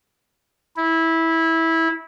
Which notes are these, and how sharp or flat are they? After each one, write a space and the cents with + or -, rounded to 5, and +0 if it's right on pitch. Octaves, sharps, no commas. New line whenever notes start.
E4 -15